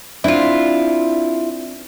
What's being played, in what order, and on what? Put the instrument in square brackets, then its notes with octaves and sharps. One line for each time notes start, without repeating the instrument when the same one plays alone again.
[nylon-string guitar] C4 D4 [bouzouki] E4 F4